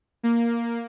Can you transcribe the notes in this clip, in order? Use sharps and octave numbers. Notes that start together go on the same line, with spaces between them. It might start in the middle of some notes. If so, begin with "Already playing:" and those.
A#3